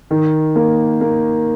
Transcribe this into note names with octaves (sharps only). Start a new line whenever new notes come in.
D#3
A#3
A#3